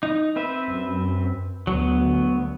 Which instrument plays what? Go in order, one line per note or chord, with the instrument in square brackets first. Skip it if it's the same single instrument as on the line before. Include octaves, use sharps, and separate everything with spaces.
[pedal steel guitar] D#4
C4 B4 E5
[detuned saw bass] F#2
[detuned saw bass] D2 [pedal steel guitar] F#3 B3